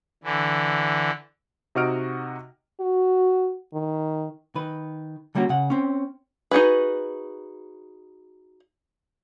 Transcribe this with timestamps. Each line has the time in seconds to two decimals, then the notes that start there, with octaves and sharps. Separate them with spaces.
0.24 D3 E3
1.75 C3 D#4 F#4 D#5 F6 D7
2.80 F#4
3.73 D#3
4.55 D#3 B4
5.35 D3 G3 A#3 C#4 F#4
5.49 C#3 F#5
5.70 C4 C#4
6.51 D#4 F#4 G#4 B4